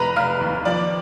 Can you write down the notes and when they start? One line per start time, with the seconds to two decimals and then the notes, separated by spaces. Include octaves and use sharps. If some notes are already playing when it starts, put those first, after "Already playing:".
Already playing: F1 B4 A#5 B5
0.16 F1 F5 F6
0.41 D#2
0.65 F3 D5 D6